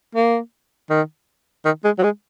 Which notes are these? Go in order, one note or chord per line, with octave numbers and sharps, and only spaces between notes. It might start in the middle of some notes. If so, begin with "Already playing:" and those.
A#3
D#3
D#3
G#3
F#3
G#3